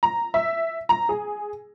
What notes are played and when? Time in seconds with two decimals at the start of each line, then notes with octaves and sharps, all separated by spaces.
0.03 A#5
0.34 E5
0.89 A#5
1.09 G#4